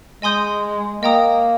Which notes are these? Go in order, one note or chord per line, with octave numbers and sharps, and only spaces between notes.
G#3 D#5 G#5 C6 D#6 G6
A#3 A#4 D#5 G5 A#5 D#6